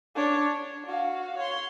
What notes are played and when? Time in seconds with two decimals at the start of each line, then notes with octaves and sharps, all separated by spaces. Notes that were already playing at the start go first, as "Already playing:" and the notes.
0.15 D4 C#5
0.54 D4
0.86 F#4 F5
1.38 C#5 C6